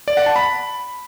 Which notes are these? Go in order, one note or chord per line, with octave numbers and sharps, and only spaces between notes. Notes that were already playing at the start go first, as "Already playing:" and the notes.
D5
F#5
A5
B5